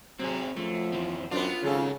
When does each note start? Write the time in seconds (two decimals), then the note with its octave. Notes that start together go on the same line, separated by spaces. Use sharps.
0.19 C3 F#3 C4 G#4
0.56 F#2 F3 A3
0.92 F2 E3 C4
1.31 F#2 B3 C4 D4 F4
1.63 G#1 G#2 C#3 F#3 A4